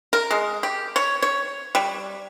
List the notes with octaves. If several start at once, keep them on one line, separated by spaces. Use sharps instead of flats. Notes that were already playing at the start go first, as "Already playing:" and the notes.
A#4
G#3
G4
C#5
C#5
G3